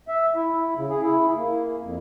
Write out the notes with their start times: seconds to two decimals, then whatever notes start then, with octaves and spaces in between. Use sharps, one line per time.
0.08 E5
0.36 E4
0.76 C#3
0.90 G#4
1.03 E4
1.36 A#3
1.82 F2